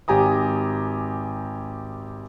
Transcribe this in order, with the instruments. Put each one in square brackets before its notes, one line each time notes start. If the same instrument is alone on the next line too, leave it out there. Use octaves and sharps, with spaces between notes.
[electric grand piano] G#1 G4 G#5 A#5 D#6